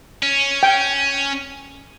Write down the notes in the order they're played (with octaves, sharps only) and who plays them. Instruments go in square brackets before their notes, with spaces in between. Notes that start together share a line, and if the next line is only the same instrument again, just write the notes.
[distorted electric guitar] C#4
[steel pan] G5